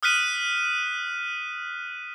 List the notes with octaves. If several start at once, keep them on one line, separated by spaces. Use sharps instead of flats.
D#6 F6 F#6 B6 D#7